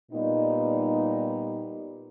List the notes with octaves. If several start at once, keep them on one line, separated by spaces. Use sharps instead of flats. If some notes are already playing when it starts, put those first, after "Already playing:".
A#2 G3 B3 D#4